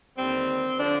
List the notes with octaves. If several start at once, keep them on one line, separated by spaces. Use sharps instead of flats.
D#2 D3 G3 C4
D3 F3 D4